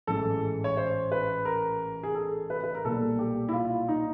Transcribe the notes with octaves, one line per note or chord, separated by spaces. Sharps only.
A1 G#2 E3 A4
C#5
C5
B4
A#4
G#4
A4
B4
B4
A#4
B1 A#2 G3 A#3 A4
G4
E4
F4
D#4